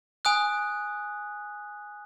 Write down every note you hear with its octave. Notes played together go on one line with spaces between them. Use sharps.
G#5 D#6 F#6